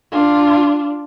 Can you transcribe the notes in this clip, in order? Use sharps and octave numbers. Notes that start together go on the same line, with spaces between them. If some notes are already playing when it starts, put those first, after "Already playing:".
D4 F4